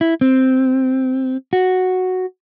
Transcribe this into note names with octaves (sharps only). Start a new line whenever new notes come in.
E4
C4
F#4